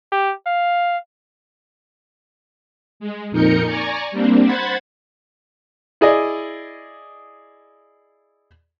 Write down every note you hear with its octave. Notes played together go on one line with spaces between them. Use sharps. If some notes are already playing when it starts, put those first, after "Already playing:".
G4
F5
G#3
F2 A#2 D#4 A#4 G6 C#7
D5 G#5 A#5 C#6
G3 A#3 C4 D4
C5 F#5 B5 G#6 A6
E4 G#4 D5 D#5